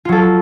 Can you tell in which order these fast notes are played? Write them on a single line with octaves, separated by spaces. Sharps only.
F4 F#3 A4